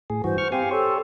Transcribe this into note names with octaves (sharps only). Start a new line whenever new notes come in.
A2 G#4
G2 E3 F#4 C5
C#6 F6
C4 G4 F5 G#5
G4 A4 C5 C#5